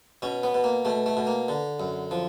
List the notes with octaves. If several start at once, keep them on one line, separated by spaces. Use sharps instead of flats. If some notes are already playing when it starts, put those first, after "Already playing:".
B2 C#4
B3
B2
A#3
B2 A3
A3
B2
A#3
D3
F#2
F3